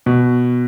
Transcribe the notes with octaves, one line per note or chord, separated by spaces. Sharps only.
B2